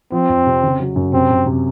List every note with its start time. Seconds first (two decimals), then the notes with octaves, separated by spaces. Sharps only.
0.12 F3 C4
0.29 F2
0.47 C3
0.63 C#3
0.80 F#3
0.96 F#2
1.13 C3 C4
1.30 C3
1.46 C3